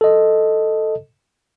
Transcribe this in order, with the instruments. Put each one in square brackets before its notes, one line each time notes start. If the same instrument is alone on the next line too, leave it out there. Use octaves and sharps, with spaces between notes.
[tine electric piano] A4 D#5